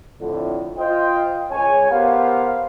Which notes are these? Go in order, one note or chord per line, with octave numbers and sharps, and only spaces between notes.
F2 A2 D3
F4 C5 D#5 G5
C#2 C#5 G#5
B3 G4 A#4 C5 F5